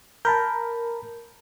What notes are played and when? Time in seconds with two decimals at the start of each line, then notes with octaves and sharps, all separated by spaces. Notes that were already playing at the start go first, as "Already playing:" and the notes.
0.25 A#4 A5 B5 G6